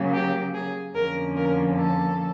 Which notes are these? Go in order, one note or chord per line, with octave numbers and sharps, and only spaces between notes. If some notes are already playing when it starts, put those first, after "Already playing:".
Already playing: C#3 F#3 A#3
G4
G#4
F2 D3 F3 A#3 C#4 A#4
A#4
A4